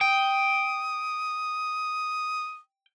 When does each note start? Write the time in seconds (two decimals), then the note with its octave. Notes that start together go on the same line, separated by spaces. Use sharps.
0.01 G5 D#6